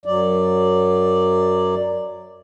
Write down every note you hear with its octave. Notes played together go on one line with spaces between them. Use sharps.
F#2 F#3 D5